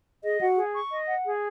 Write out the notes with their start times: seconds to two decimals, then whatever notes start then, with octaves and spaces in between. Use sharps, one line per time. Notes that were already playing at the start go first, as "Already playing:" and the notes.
0.23 G#4 D#5
0.41 F#4 F#5
0.57 G#4
0.74 C#6
0.91 D#5
1.08 F#5
1.25 G#4